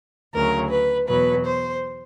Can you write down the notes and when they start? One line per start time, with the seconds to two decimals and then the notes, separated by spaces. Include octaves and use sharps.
0.33 D2 C#3 F#3 A#4
0.71 B4
1.08 E2 B2 F#3 B4
1.45 C5